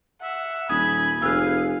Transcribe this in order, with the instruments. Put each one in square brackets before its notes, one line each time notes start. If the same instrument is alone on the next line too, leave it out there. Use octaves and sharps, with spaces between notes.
[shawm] E5 [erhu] F#5
[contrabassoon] D#1 [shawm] G#5 [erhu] B5 [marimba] D#6
[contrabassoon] F1 [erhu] G#4 [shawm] F5 [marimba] E6 F#6